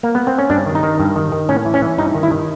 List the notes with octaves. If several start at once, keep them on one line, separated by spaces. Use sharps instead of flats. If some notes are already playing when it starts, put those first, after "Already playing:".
A#3
B3
C4
C#4
G2 D4
D#3
D#4
D#3
G2
D#3
D#3
A2 C#4
E3
C#4
E3
G2 D#4
D#3
E4
D#3